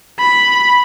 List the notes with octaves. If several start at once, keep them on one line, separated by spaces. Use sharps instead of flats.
B5